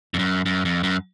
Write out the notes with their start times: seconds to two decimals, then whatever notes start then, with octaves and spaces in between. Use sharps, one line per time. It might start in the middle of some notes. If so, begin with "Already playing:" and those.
0.14 F2
0.19 F#2
0.46 F#2
0.65 F2
0.83 F#2